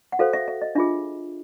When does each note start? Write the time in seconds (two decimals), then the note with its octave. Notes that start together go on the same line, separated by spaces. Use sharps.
0.12 F#5
0.19 F#4 A4 C5 F5
0.33 E5
0.48 E5
0.62 D#5
0.75 D4 F4 G#4 E5